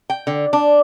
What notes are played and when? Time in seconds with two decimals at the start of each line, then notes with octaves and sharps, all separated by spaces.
0.10 G5
0.27 D3
0.53 D4